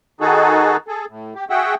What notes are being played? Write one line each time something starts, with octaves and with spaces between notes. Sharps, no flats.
D#3 D#4 F#4 G#4 A4
G#4 A4
A2
G4
F#4 G#4 E5 F#5 G5